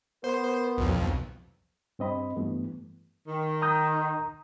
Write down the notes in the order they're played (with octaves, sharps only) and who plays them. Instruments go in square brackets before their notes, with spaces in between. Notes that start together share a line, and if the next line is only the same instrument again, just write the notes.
[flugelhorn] B3 [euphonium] A#4 [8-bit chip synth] C5
[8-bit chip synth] B1 F2
[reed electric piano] G2 C4 D#5 B5
G2 E3 A3 B3
[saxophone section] D#3
[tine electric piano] A#5 D#6 G6